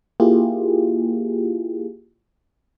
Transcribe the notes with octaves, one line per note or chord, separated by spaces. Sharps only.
A#3 E4 F4 G4 G#4